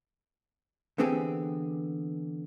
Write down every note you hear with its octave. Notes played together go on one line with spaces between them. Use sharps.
D3 E3 B3 C4 G4 G#4